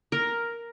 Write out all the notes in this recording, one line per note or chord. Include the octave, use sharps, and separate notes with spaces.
A#4